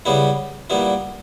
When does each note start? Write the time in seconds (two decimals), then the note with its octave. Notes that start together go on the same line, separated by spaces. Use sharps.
0.06 C#3 G3 B3 E4
0.70 A#2 G3 B3 E4